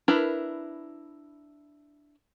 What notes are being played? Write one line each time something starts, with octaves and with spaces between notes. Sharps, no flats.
D4 E4 A#4 B4